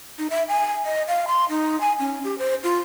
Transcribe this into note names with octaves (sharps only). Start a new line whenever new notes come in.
D#4
E5
G#5
D#5
F5
C6
D#4
G#5
C#4
G4
C5
F4